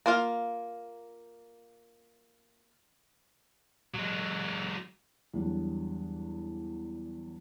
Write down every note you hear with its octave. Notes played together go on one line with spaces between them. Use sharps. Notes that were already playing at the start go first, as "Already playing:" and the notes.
A#3 F4 F5
F#3 G#3
E2 F#3 G3 D4